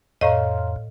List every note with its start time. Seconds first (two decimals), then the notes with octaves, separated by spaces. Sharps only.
0.21 F2 A2 C#5 D#5 F5 A#5